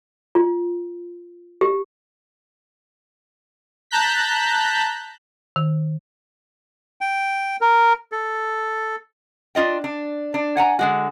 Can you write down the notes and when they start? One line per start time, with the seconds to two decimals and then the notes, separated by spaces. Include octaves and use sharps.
0.35 F4
1.61 G4
3.91 A5 A#5 F#6 G6 B6
5.56 D#3
7.01 G5
7.61 A#4
8.12 A4
9.55 D4 F4 D#5 G5
9.84 D4
10.34 D4
10.57 F#5 G#5 A#5
10.79 D3 G#3 F#4